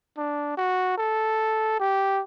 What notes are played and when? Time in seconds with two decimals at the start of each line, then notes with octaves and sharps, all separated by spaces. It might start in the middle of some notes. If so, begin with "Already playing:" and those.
0.17 D4
0.57 F#4
0.98 A4
1.80 G4